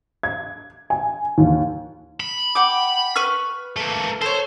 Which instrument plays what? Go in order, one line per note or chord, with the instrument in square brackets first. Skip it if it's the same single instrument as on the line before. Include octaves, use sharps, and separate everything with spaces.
[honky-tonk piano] G#6
G#5
D#2
[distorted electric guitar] B5
[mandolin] F#5 G5 D6
B4 C#6 F6
[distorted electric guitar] A3 A#3
[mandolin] A4 C#5 [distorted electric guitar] C5